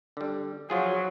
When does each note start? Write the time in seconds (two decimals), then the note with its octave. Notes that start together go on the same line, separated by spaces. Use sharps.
0.17 D3 G3
0.70 F3 F#3 F4 G#4